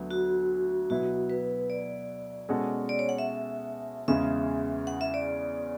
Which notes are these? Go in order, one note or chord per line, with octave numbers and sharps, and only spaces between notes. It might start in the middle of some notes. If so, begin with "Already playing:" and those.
Already playing: D2 D3 F#3 B3
F#4
B2 F#3 B3 E4 F#4
B4
D5
B2 G#3 C#4 F#4 A4
D5
C#5
F#5
E5
E2 C#3 G#3 C#4 G#4 E5
F#5
E5
D5